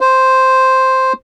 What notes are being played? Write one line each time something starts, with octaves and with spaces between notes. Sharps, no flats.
C5